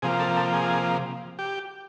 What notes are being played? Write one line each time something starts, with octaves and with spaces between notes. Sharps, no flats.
C3 F3 A#3 G#4
A4
A4
G#4
G4